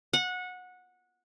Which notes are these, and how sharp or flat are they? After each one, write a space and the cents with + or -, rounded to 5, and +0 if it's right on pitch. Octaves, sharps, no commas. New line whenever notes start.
F#5 -20